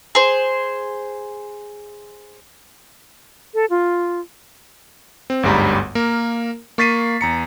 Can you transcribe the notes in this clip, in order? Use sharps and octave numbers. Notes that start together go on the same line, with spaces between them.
G#4 C5
A4
F4
C4
G1 D2 G#2 G3 A#5 B5
A#3 A#4
A#3 C#6 A6 B6 C7 D#7
E2 A#5 C#7